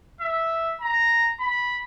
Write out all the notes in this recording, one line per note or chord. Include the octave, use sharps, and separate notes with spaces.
E5
A#5
B5